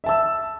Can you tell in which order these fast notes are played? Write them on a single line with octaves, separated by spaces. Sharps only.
E5 A5 E6